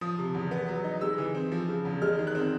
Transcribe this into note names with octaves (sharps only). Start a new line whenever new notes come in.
F3 D#6
C3
E2
B3
F#3
D#4
G#3 E6
E3
C4
F3
C#3
E2
G#3 F6
D#3
F#6
C4